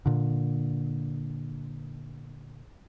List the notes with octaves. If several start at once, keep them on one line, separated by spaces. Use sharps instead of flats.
A#2 D3